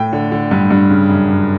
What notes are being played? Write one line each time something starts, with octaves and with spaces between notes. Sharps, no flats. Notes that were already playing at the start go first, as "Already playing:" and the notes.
Already playing: A2 G5
D3
D3
G2
G2
C#3
F#2
F#2